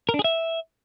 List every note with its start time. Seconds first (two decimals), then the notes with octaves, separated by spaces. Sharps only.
0.09 A#4
0.14 D4
0.19 G#4
0.24 E5